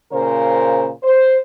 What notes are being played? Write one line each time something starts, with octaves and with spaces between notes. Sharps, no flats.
A#2 C#3 A#4 C5
C5